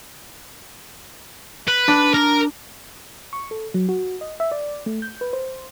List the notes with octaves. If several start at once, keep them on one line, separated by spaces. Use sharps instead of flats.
B4
D4
A#4
C#6
A4
F#3
F#4
D#5
E5
D5
A3
G6
B4
C5